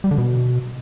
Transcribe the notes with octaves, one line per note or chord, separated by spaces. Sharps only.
G3
D3
B2